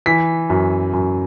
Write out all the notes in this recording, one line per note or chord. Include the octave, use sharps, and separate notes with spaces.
E3 B6
F#2
F#2